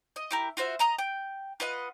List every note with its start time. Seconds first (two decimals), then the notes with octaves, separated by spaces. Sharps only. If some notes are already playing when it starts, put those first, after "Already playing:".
0.16 D#5
0.31 E4 G4 A#4
0.57 F4 F#4 C5 E5
0.79 D#5 A#5 D#6
0.98 G5
1.60 F4 B4 D#5 F#5